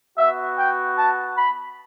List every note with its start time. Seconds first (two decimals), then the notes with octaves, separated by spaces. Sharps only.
0.18 B3 F#4 E5
0.58 G5
0.97 A5
1.37 B5